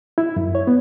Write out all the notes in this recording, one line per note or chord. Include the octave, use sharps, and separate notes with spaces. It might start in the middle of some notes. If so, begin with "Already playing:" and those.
E4
F#2
C#5
B3